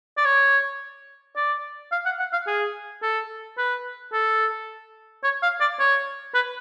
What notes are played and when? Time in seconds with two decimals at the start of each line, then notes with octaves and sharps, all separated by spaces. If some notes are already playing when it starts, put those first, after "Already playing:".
0.17 D5
0.25 C#5
1.36 D5
1.92 F5
2.05 F#5
2.19 F#5
2.33 F5
2.47 G#4
3.02 A4
3.58 B4
4.13 A4
5.24 C#5
5.42 F5
5.60 D5
5.79 C#5
6.34 B4